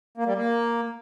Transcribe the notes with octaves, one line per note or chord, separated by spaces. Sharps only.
A#3
G3
A#3